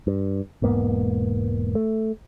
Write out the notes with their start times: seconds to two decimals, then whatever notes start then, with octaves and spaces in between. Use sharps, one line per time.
0.07 G2
0.62 E1 G#2 A#3 B3
1.75 A3